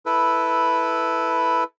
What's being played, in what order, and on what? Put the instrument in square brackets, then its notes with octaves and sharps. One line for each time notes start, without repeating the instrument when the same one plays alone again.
[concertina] E4 A4 B4